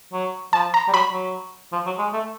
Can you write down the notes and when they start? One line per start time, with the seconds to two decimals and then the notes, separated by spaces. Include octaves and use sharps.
0.13 F#3
0.53 F3 A5
0.74 A#5
0.88 G3
0.93 F#3 B5
1.13 F#3
1.73 F3
1.86 F#3
1.99 G#3
2.13 A3